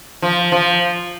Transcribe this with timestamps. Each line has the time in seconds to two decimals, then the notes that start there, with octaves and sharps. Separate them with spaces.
0.22 F3
0.52 F3